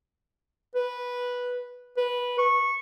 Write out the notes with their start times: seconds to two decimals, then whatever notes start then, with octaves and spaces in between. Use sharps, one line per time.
0.75 B4
1.97 B4
2.38 C#6